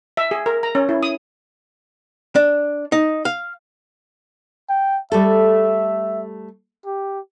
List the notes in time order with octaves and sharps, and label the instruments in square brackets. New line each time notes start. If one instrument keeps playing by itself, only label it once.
[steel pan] E5
G#4
A#4
A#5
C#4
E4
D#6
[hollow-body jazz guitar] D4
D#4
F5
[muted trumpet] G5
[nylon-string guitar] G3 A3 A4 [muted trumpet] E5
[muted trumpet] G4